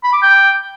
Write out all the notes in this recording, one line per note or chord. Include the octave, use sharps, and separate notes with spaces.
B5
D6
G5